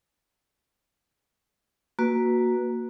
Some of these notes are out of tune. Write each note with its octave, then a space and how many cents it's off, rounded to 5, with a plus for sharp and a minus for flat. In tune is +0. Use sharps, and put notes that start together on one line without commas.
A#3 +0 F#4 -10 B4 +0